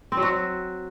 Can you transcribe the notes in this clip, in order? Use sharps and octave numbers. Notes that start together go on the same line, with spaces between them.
C4
F#3
F#4